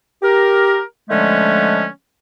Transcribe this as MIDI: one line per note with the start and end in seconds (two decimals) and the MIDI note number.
0.22 0.79 67
0.22 0.79 70
1.09 1.86 50
1.09 1.86 53
1.09 1.86 56
1.09 1.86 57
1.09 1.86 59
1.09 1.86 61